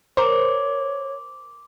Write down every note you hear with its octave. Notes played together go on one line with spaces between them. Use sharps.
A#4 C5 C#5 C6 D6